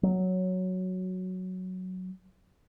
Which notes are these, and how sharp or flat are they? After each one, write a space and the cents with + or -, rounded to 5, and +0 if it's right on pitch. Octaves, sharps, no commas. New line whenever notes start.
F#3 +0